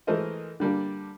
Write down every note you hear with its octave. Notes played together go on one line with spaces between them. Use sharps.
E3 G#3 A3 A#4 C5 D#5
D3 G3 A#3 D4